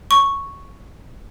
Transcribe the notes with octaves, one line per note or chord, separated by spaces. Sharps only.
C#6